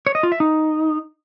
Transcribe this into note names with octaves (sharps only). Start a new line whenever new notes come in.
C#5
D#5
F4
E5
D#4